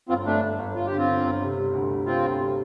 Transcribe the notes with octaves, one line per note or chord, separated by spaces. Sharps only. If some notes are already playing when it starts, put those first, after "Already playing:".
G1 C4 F4
G1 A3 D4
G1
G1
G1 F4
G4
D3
C4 F4
D3
G1
C3
G3
D2
D2
C3 C4 F4
D2
G3